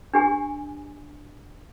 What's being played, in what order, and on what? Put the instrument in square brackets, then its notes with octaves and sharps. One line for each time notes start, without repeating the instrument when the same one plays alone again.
[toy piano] D4 G4 G#5